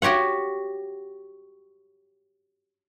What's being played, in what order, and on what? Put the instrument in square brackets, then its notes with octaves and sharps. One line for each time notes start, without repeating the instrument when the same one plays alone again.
[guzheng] F#4 G4 C#5 F#5